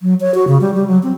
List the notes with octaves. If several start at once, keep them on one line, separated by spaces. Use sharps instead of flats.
F#3
C#5
F#4
C#3
G3
G3
F#3
C4